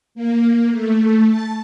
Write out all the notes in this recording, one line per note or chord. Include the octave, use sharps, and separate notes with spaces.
A#3
A3
A5